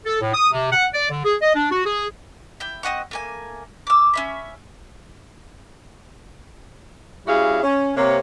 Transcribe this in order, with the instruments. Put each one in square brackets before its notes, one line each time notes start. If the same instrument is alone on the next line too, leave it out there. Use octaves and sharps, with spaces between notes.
[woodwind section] A4
A2
D#6
C3
F#5
D5
D3
G#4
D#5
D4
F#4
G#4
[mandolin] E4 G5
C4 D#5 F#5 C#6
A3 A#3 G#5
D6 E6
C#4 E5 B5
[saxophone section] G3 C#4 E4 F#4 G#4 F5
C#4
C3 A#3 C#5